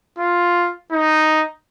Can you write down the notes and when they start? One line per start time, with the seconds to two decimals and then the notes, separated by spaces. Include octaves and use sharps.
0.19 F4
0.92 D#4